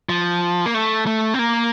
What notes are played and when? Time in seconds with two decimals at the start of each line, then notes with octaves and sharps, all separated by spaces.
0.09 F3
0.66 A#3
0.74 A3
1.07 A3
1.34 C4
1.39 A#3